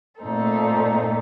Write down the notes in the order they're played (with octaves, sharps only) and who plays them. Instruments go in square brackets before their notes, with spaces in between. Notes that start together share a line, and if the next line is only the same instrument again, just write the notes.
[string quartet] A#2 A3 C4 D#4 A4